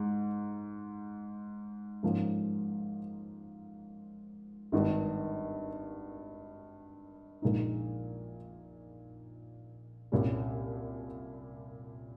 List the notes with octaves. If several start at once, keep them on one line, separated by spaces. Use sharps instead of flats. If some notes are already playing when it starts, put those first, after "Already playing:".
Already playing: G#2
G#2 F3 A#3 C#4
G#1 G2 D#3
A#1 A#2 G#3 D#4
C2 A#2 G3 C#4